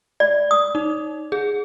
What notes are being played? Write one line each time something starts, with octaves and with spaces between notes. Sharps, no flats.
D5
D#6
D#4
G#4